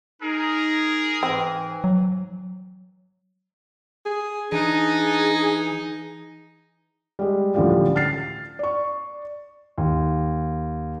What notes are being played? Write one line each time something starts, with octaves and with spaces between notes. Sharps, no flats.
D#4 G#4 A#4
G#2 E3 C4
F#3
G#4
E3 D4 D#4 G#4
G3 G#3
C#2 A2 D3 E3 F3 G3
F6 A6 C7
D5 C#6
D#2